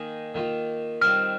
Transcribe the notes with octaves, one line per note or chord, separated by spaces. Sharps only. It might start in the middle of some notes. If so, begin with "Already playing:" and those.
Already playing: D#3 A#3 D#4 G#4
D#3 A#3 F4
D#3 G3 C4 F4 F6